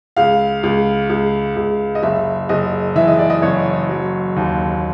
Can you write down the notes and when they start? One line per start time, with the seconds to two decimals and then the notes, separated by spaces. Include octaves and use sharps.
0.17 C#2 F5
0.63 C#2
1.09 C#2
1.56 C#2
1.95 D#5
2.03 F#1 E5
2.49 F#1 D#5
2.96 E3 E5
3.08 D#5
3.19 D5
3.30 D#5
3.42 F#1 C#5
3.89 F#3
4.36 D#2